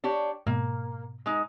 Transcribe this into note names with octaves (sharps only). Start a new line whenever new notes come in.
D4 G4 C#5
G#2 B2 A#3
G#3 D#4